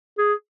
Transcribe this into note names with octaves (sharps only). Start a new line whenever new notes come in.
G#4